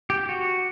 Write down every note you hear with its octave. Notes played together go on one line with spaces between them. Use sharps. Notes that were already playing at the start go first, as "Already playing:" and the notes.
G4
F#4